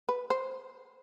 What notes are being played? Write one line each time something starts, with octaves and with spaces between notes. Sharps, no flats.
B4
C5